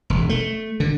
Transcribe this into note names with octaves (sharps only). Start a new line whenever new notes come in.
E1
A3
D3